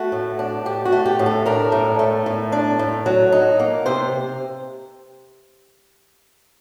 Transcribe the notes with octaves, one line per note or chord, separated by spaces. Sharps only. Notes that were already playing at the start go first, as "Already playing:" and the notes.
Already playing: A3 F#4
A2
D4
A2 G4
F#4
A3
G4
A2
A4
D4 A#4
A2
A3
A2
D4
A2
F#3
D#4
A#3
C3 C5